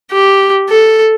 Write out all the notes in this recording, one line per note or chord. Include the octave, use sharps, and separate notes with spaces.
G4
A4